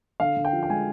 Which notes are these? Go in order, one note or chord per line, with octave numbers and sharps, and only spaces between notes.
D3 F5
D3
G5
F3
G5
G#3 G#5